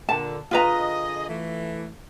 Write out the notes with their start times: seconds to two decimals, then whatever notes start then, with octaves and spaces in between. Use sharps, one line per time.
0.09 A#2 D3 A5
0.51 D3 F4 G#4 B4 D#5 A#5
1.27 E3 A3